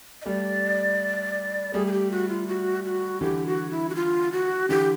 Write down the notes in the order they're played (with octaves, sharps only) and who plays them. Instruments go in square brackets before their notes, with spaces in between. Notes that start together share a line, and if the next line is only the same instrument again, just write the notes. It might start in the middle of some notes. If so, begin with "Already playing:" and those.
[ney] D#5
[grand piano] G3 A3 [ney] D5
[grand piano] G3 A3 [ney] G#4
[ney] G#4
G4
F#4
F4
F#4
F#4
[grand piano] D3 E3 [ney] G4
[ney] F#4
E4
F#4
F4
F#4
[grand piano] D3 E3 [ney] G4